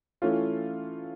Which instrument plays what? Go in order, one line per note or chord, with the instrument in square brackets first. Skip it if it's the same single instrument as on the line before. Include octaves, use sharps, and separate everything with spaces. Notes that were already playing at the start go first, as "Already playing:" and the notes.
[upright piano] E3 A3 C#4 F4